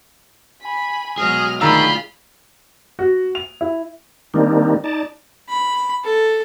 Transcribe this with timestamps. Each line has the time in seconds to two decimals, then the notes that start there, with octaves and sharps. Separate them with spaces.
0.63 G#5 B5
1.18 B2 F#3 G#3 G#4 D#6 F6
1.61 D3 D#3 A3 F4 G#4 A#5 B5 E6
2.99 F#4
3.35 F7
3.61 E4
4.34 D#3 G3 A#3 C4 D4 D#4
4.84 D#4 D5 A5
5.49 B5
6.04 A4